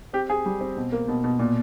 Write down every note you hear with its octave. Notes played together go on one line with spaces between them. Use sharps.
C4 G4
C4 G#4
G3
C4
B2
A#3
B2
B2
A#2